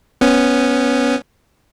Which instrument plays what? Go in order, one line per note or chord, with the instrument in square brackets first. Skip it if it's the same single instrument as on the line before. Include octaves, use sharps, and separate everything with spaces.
[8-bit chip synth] B3 C#4